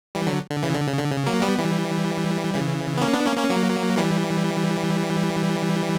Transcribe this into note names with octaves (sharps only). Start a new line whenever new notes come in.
E3 G3
D3 F#3
D3
C#3 E3
D3
C#3
D3
C#3
F#3 A#3
G3 B3
E3 G3
C#3 E3
B3
A#3 C#4
B3 D4
A#3 C#4
A#3 C#4
F#3 A#3
E3 G3